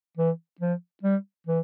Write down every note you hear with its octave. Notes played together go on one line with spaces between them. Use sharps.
E3
F3
G3
E3